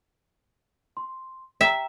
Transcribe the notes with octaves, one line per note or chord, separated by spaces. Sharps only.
C6
E5 G5 A#5